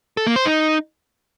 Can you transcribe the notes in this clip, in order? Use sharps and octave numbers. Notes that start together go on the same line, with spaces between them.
A4
A#3
C5
D#4